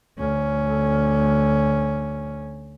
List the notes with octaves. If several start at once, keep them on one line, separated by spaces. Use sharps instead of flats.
D2 C#4